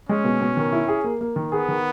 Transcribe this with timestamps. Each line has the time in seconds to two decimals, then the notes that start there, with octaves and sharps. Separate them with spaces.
0.09 G#3 C#4
0.24 B2
0.41 B2
0.57 D#3
0.73 E4
0.88 G#4
1.04 A#3
1.21 A#3
1.36 D#3
1.52 B3 G#4
1.68 D#3